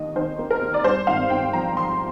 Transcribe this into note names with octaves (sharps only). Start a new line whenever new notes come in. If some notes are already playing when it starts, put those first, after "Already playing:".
Already playing: D#2 D#3 D#5
D#3 C5
A#3
A#4
D#2
D5
G2 C5
G#1 F5
G#1 G5
F3 A#5
F3 C6